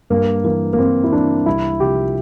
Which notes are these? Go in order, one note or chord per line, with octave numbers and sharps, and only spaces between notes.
G2 A#3
E3 A#3
A#3
G2 C4
E4
E3 D4
C2 E4
C3 F3 G4